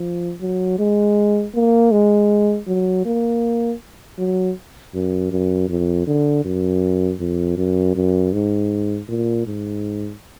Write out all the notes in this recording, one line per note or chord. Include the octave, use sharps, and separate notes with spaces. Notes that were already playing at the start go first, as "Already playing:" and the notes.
Already playing: F3
F#3
G#3
A#3
G#3
F#3
A#3
F#3
F#2
F#2
F2
D3
F#2
F2
F#2
F#2
G#2
A#2
G#2